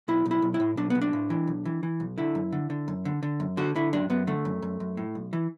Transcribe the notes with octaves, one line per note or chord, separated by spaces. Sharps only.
B1 E4
B1
E4
B1
E4
A2
B1 D4
B1 B3
D4
A2
E3
B1
E3
E3
B1
D3 E4
F#2
D3
D3
F#2
D3
D3
F#2
D3 F#4
D3 E4
F#2 D4
F#2 B3
D3 A3
F#2
F#2
F#2
A2
B1
E3